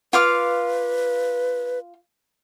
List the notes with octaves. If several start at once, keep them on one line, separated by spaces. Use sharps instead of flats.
F4 B4 F5 D6